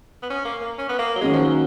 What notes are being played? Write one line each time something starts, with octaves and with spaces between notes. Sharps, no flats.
B3
C#4
A#3
A#3
C#4
B3
A#3
F#3
D#3 G#3 A#3 C#4 F#4 A#4
F3
F#3